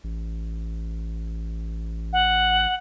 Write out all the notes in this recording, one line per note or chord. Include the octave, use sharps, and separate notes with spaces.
A1
F#5